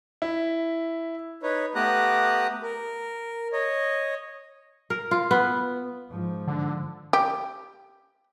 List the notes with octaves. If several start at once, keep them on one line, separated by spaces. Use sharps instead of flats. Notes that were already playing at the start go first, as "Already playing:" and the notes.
E4
D#4 B4 C#5
A3 B3 G4 A#5 D#6 F#6
A#4
C#5 D#5
A#4
F4
B3
G#2 F3
D3
G4